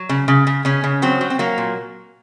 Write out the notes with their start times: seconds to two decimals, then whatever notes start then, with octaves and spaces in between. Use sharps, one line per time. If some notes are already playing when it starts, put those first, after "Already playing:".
Already playing: F#3
0.09 C#3
0.28 C#3
0.47 C#3
0.65 C#3 C#4
0.84 C#3
1.02 F#3 C4
1.21 F#3
1.30 C4
1.39 F#3 A#3
1.58 A#2